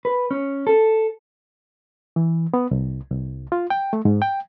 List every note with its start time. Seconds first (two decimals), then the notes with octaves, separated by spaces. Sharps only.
0.05 B4
0.31 C#4
0.67 A4
2.16 E3
2.54 B3
2.71 C2
3.11 C2
3.52 F4
3.70 G5
3.93 A3
4.05 G#2
4.22 G5